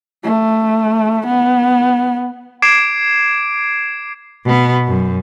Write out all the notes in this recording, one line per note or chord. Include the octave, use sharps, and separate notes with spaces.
A3
B3
D6 G#6 C7 D7 E7
B2 B3
F#2